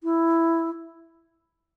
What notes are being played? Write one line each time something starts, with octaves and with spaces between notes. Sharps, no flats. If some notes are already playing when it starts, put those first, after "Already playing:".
E4